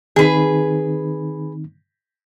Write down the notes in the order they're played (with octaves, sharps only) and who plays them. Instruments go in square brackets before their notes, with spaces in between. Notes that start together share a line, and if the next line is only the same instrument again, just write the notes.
[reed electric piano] D#3 C4 D#4 [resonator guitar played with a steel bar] G#4 B4